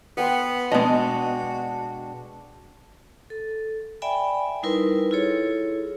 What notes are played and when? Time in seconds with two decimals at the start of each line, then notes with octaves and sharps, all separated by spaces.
0.17 B3 F#5 G5 C6
0.72 B2 G#3 B3 D4 F#4 D#5
3.30 A4
4.02 D5 E5 G5 G#5 B5
4.63 G3 D#4 E4 A#4 B4 C6
5.11 E4 F4 G#4 A4 C#5